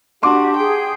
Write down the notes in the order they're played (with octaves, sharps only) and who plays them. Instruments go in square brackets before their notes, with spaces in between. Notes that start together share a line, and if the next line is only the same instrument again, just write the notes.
[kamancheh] D4 F#4 [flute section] G4 [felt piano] C6 D6
[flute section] G#4 [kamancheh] G5